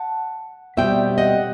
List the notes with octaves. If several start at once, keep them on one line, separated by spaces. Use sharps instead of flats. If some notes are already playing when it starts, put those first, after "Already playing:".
Already playing: F#5 A5
B2 G3 C4 E5 G5
D#5 F#5